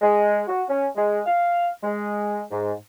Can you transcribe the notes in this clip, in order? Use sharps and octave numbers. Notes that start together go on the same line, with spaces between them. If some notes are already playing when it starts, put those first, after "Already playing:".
G#3
F#4
C#4
G#3
F5
G#3
G#2